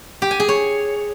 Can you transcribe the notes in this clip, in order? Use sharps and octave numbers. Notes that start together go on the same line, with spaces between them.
G4
G#5
G#4
C#5